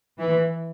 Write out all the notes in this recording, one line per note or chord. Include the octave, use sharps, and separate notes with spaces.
E3